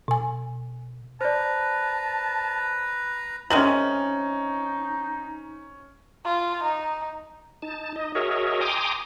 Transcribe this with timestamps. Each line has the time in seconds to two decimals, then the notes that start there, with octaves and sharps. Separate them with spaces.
0.08 B2 G#5
1.21 B4 C5 D5 A5 A#5
3.50 C3 D#3 G#3 C#4 D#4 F#7
6.25 F4
6.64 D#4
7.62 D#4 A5
7.96 D#4 D#5
8.15 F#4 G#4 A#4 C#5 D#5 E5
8.61 G5 G#5 A#5 C6 D6 D#6